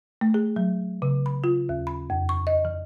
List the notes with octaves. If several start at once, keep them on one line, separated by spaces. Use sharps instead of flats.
A3
G#4
F#3
C#3
B5
F4
D#2
B5
F2
C#6
D#5
E3